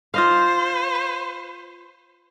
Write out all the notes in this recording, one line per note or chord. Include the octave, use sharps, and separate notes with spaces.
F4 C5 D#5 F5